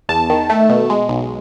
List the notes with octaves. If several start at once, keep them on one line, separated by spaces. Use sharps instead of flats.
E2 A5
D#3
A3
B2
G#3
B1